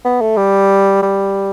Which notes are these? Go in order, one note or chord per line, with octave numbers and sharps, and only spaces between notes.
B3
A3
G3
G3